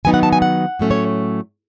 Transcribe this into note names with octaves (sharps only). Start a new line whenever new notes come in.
D#3 F#3 B3 D#4 G#5
F#5
A5
G#5
F#5
A2 F#3 A3 C#4
C#5